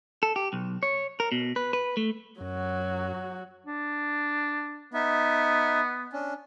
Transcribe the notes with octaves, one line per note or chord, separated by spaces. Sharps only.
A4
G4
B1
C#5
A#4
B2
B4
B4
A3
F#2 F#3 F#4
D4
B3 D#4 E5
C#4 D4